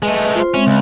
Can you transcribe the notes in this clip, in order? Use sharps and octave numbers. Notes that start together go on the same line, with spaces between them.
G#3 A3 B4 D#5
F4 C5 C6
G#3 C4 C#4 E5
C#2